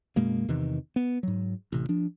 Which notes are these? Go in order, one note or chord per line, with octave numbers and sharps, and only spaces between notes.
F#2 B2 G#3 A#3
E2 C3 D#3 E3
B3
G#2 F#3
A1 C3
F3 D4